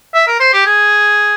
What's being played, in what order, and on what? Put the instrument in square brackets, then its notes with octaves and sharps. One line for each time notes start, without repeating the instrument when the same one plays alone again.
[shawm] E5
A#4
C5
G4
G#4